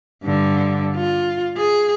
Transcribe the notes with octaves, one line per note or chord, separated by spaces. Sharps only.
G2 D3
F4
G#4